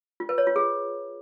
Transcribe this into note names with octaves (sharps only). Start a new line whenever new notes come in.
F4
B4
C#5
F4
G#4